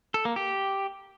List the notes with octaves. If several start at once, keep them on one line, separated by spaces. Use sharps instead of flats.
A4
A#3
G4